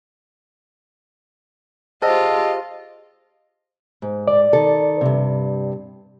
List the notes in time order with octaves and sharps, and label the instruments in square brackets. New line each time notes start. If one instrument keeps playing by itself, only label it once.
[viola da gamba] F4 G4 [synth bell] G#4 C5 [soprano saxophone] D#5 [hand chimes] A5 E6
[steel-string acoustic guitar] G#2
[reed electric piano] D5
[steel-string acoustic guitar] D#3 A4
G2 C3